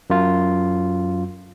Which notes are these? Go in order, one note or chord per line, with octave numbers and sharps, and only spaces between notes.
F#2 F4